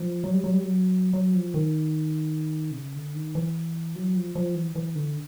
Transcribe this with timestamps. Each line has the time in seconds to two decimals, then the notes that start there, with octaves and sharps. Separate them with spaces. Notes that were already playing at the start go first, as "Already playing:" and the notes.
Already playing: F3
0.24 F#3
0.33 G3
0.44 F#3
0.53 G3
0.63 F#3
1.13 F#3
1.34 F3
1.54 D#3
2.71 C3
2.75 C#3
2.95 D3
3.14 D#3
3.35 E3
3.95 F#3
4.15 F3
4.35 F3
4.55 E3
4.75 E3
4.95 D3